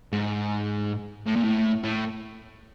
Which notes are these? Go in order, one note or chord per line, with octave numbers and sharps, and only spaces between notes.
G#2
A2
A#2
A2
A2